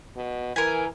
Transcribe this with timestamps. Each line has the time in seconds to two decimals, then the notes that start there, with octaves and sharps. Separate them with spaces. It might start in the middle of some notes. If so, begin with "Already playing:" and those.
0.17 B2
0.56 E3 A#4 G#5